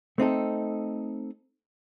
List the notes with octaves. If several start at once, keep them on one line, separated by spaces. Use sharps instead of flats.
A3 C4 D#4 A4